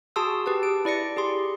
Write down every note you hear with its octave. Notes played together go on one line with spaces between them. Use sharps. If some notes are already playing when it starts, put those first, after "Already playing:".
F#4 G#4 A5 C6 D#6 E6
G4 B4 A5
D7
E4 D5 A#6 C#7
G4 G#4 C6